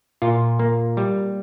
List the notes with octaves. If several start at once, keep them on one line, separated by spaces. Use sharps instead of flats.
A#2 F4
A#3
G3